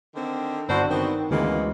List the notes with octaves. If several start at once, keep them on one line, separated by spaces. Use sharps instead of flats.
D3 D#3 C4
G1 D4 E4 F#4 C5
D#3 B3 C4
D2 C#3 E3 G#3 A#3 B3